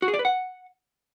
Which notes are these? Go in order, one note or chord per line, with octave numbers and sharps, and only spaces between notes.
F#4
G#4
D5
B4
F#5